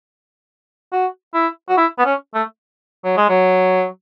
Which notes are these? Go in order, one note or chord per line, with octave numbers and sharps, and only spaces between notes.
F#4
E4
F#4
E4
B3
C#4
A3
F#3
G#3
F#3